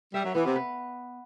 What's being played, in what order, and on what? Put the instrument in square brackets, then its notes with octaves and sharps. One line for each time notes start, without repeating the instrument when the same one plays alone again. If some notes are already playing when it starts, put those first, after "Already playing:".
[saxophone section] G3 [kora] E5
[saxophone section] F#3
[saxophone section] E3 [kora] B3
[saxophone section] C3
[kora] B4